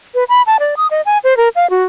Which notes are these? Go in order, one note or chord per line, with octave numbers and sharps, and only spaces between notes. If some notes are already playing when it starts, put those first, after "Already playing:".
B4
B5
A5
D5
D#6
D#5
G#5
C5
A#4
F5
F#4